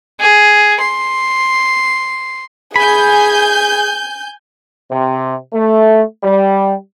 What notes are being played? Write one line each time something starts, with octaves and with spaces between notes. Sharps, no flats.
G#4
C6
G#4 G#5 B5 G6
C3
A3
G3